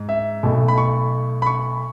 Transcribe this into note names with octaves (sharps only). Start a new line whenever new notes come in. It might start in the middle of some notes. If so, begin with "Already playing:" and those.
Already playing: G#2
E5
B1 B2 A3
B5
C#6
B5
C#6